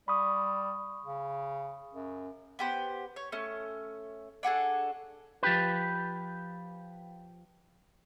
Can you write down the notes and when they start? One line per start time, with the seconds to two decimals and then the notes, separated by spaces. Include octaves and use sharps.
0.08 G3 B5 C#6 D#6
1.06 C#3
1.93 F#2
2.59 B3 G4 C5
3.16 C#5
3.32 A3 C#4
4.43 D4 F#4 G#4 A4
5.43 F3 G4 B4